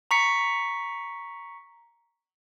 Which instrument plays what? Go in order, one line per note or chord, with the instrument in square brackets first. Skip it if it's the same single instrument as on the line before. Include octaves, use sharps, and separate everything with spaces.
[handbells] A#5 C#6 B6 C#7